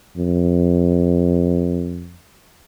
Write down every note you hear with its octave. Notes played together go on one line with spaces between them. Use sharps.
F2